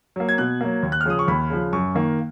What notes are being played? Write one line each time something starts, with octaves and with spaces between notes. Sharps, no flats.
F#3 A#3
G#6
B2 F#6
F#3 A#3
D#2
F#6
F6
C#3 F3 D#6
C#6
D#2 B5
C#3 F3
F#2 C#6
D#3 A#3